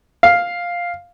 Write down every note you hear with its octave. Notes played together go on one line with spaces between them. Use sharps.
F5